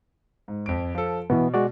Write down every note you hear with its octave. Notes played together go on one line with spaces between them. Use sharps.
G#2
F2 D7
F3 A4
B2 E3 B3
G#3 F#4 D5